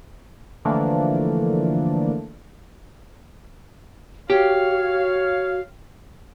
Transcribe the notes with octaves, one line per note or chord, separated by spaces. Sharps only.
D3 E3 F3 A3 A#3 D4
F#4 G4 C#5 F5